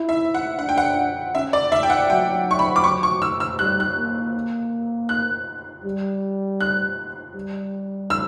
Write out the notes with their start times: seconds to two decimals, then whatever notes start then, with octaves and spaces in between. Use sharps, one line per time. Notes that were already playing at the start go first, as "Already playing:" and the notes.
Already playing: E4
0.09 E5
0.34 F#5
0.59 D4 F#5
0.69 G5
0.78 F#5
1.35 C#4 E5
1.53 D5
1.72 E5
1.83 G5
1.90 F#5
2.09 F#3 G5
2.51 C#6
2.59 B5
2.76 D6
2.84 C#6
3.03 C#6
3.22 E6
3.40 E6
3.59 G3 F#6
3.80 F#6
3.96 A#3
5.09 F#6
5.85 G3
6.61 F#6
7.36 G3
8.10 E6